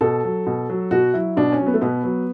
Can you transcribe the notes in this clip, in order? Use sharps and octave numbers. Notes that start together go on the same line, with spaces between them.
B2 A4
F#3
B2
F#3
B2 F#4
F#3 E4
B2 D4
C#4
F#3
B3
A3
B2 B3
F#3